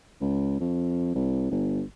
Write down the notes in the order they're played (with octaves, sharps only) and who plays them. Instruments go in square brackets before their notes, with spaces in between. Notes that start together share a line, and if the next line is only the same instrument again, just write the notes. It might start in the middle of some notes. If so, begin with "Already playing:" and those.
[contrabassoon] C#2
F2
C2
G1